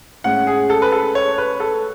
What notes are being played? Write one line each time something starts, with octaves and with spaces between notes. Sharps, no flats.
A2 G#3 C#4 F#5
G#4
A4
B4
A4
C#5
B4
A4